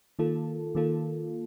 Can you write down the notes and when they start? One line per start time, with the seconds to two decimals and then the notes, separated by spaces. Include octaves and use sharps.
0.19 D#3 A#3 F4 A4
0.75 D#3 A#3 F4 A4